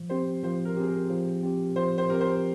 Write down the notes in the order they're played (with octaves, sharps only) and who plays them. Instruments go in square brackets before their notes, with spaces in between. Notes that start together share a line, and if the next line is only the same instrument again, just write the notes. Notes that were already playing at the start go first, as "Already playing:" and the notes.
Already playing: [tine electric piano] F3
[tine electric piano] C4 G4 [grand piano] C5
[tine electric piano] F3 [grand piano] C5
[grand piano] A#4
[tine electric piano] C4 G4 [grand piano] G#4
[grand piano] A#4
[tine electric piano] F3
C4 G4
[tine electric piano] F3 [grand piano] C5
[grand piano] C5
[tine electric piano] C4 G4 [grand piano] A#4
[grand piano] C5